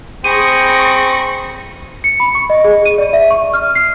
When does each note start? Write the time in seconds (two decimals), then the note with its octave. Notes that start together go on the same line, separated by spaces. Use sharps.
0.24 C4 G#4 B5 C#6 A#6 D#7
2.04 C#7
2.20 B5
2.35 C#6
2.50 D#5
2.64 G#4
2.85 D#7
2.98 D5
3.13 E5
3.31 C#6
3.54 F6
3.75 C7